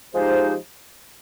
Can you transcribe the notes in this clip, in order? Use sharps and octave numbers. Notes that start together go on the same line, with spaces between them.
F3 G#3 D#4 G4 C5